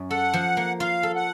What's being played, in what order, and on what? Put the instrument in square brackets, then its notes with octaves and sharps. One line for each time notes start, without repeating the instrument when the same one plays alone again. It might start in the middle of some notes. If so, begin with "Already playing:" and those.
Already playing: [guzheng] F#2 C#4
[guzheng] A4 [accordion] F#5
[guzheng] F3
A#3
[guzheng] F4 [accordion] F5
[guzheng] A4
[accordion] F#5